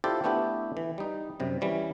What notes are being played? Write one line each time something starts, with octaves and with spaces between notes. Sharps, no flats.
E4 F4 G4 A4 C5 D5
A3 B3 D4 E4 G4
E3
G3 D#4
F#2 C3 G3
E3 G3 C#4